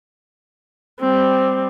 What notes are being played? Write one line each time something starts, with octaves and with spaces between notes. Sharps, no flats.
G3 C4